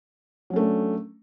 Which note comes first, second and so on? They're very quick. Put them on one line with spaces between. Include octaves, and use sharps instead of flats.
F#3 C#4 A3 D4